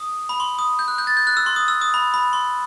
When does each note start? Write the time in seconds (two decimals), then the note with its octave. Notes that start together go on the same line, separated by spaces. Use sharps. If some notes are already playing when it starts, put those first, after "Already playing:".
Already playing: D#6
0.29 B5
0.40 C6
0.59 D#6
0.79 G6
0.88 F#6
0.98 G6
1.07 A6
1.17 G6
1.27 F#6
1.37 E6
1.46 C6
1.56 D#6
1.68 E6
1.82 D#6
1.94 B5
2.14 B5
2.33 C6